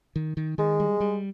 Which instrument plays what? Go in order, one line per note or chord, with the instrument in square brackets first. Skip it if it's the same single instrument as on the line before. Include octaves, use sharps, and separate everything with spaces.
[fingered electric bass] D#3
D#3
[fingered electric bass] D#3 [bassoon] G#3
[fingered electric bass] G3
G3